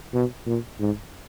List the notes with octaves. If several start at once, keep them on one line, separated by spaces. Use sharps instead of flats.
B2
A#2
G#2